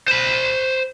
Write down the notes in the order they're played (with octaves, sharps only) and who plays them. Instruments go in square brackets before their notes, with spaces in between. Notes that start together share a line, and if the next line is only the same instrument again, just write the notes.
[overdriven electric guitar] C5 B5